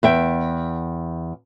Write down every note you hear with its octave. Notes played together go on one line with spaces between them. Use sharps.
E2 E5 G5